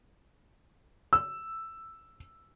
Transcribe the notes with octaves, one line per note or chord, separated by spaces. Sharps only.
E6